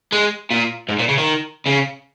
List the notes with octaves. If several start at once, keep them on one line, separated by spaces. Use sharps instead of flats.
G#3
A#2
G#2
A#2
C#3
D#3
C#3